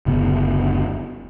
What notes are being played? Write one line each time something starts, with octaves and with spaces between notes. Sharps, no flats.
F#1 D2 C#3 B3